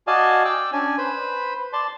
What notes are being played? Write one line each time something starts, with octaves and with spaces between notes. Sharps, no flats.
F#4 D5 D#5 F5 G#5 A5
D5 G5 E6
C#4 D4 G#5
B4 C5 B5
D5 A5 C6